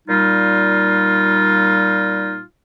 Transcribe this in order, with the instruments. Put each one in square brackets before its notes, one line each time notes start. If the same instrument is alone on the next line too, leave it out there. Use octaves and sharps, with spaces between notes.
[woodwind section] A#2 G3 D#4 F4